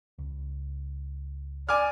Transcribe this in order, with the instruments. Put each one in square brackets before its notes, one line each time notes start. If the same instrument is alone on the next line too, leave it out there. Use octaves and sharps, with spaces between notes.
[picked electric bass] C#2
[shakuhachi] D5 [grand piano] G#5 D6 F6